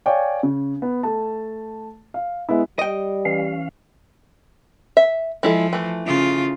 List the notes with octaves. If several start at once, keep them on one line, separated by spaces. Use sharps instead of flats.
C#5 D5 F5 G5 G#5
C#3
B3
A3 A5
F5
G#3 B3 E4
G3 D#5 G5
E3 C#4 F5
E5
F3 G#3 E4 A4
E3 A3
C#3 F4